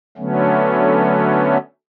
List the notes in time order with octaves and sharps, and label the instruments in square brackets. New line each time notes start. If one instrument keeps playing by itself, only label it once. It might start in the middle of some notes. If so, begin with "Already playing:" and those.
[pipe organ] D3 F#3 A3 B3 C#4